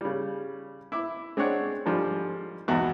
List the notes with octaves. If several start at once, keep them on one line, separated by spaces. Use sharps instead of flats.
C#3 G3
E4 D6
G#3 C4 D4 C#5 F#5
G#2 D3 F3 G3
B1 E2 G#2 F#4